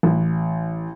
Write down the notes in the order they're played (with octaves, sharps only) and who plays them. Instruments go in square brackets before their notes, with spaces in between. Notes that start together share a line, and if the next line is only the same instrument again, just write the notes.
[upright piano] A1